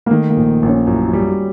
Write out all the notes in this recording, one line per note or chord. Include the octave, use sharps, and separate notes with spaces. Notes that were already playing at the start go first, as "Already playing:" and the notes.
A#3
D#3 A3
A#3
A#1
A#1
C#4
F#2 E4
F4
G3
F#4